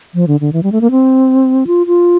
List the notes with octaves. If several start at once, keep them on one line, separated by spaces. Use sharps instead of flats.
F3
D3
D3
E3
G3
A3
A#3
C4
F4
F4